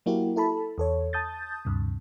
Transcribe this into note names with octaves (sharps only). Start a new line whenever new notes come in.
F#3 A#3 E4 F#4 G4 A#4
E4 A4 A5 B5
E2 A4 C#5
A5 D#6 G6 A6
D2 G2 C3